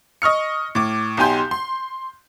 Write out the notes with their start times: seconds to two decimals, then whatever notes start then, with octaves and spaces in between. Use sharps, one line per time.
0.22 D#5 C#6 F6 C#7
0.75 A2 D6
1.17 B1 D#4 G4 G#5 C6 G6
1.51 C6